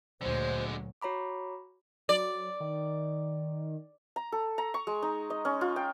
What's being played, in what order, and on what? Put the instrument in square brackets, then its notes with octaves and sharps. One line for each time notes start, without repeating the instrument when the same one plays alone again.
[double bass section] D2 A#2 F#3 [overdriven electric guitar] D3 G#3 [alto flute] C5
[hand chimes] F#4 C#5 A#5 B5 D6
[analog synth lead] F#3 [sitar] D5
[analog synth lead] D#3
[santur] A#5
A4
A#5
C#6
G#3
D#4
D#5
C#4
F4
G5